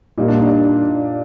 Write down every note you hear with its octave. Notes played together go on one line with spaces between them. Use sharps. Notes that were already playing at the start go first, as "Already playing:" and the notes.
A#2 G3 A#3 D#4
D4
D#4